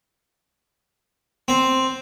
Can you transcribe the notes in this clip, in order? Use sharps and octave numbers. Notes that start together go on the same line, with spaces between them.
C4